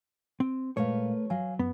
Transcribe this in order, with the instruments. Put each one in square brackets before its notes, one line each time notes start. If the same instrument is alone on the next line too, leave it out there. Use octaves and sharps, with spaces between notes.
[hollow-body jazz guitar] C4
[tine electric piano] A#2 G#3 F5 [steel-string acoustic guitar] A3 A#4 B4 [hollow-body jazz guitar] C#5
[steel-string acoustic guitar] F#3 [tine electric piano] F5 G#5
[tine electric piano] F#2 [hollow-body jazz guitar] B3